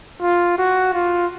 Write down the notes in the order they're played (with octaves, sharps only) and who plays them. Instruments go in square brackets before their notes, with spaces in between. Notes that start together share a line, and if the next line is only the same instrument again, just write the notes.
[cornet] F4
F#4
F4